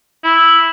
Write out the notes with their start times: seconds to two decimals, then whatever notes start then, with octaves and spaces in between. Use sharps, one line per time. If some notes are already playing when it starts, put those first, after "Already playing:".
0.24 E4